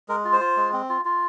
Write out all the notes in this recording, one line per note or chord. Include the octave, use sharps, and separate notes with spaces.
G#3 A#4
F4
C5
F4
G#3
C4
F4
F4